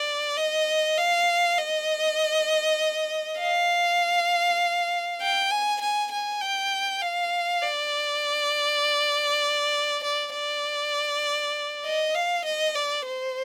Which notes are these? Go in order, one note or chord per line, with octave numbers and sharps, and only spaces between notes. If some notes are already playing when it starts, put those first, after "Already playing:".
Already playing: D5
D#5
F5
D#5
F5
G5
G#5
G#5
G#5
G5
F5
D5
D5
D5
D#5
F5
D#5
D5
C5